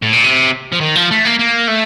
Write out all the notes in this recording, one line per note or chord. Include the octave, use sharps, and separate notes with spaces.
A2
A#2
C3
F3
D#3
F3
A3
A#3
A#3
A3